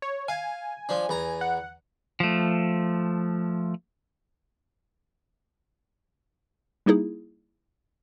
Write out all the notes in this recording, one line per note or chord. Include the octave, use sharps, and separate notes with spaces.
C#5
F5 G#5
F3 D4
E2 A#5
F#5
F3 A3
G3 A#3 D#4 E4 G#4